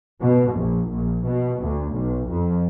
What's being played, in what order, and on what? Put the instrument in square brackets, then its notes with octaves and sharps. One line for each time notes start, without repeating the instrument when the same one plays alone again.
[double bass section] B2
A#1
A#1
B2
D2
B1
F2